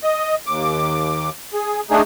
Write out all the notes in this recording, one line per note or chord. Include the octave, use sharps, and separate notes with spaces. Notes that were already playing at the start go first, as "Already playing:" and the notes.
D#5
D#2 D6
G#4
A3 D4 D#4 G#4